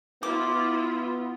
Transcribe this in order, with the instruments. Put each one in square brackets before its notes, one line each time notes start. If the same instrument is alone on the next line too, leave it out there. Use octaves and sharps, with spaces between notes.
[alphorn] B3 [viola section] E4 F4 [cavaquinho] D6